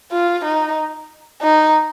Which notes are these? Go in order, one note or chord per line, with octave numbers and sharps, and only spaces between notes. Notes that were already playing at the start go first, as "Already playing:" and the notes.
F4
D#4
D#4